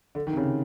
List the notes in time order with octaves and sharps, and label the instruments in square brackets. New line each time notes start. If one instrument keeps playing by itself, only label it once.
[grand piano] D3
D#3
C3
C#3